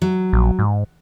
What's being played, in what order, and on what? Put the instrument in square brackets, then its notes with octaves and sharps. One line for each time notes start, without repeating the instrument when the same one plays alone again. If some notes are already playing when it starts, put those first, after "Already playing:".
[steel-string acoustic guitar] F#3
[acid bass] A#1
G#2